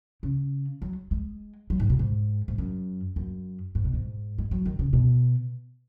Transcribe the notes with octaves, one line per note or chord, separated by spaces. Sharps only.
C#3
F#3
G#3
F#3
G#2
B2
G#2
G#2
F#2
F#2
G#2
B2
G#2
G#3
F#3
D#3
C#3
B2